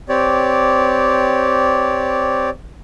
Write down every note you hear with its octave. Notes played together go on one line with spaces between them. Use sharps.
C4 G4 C#5 D5